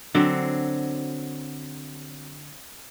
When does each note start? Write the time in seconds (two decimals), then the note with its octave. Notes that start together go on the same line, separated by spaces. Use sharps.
0.15 D3 F#3 C4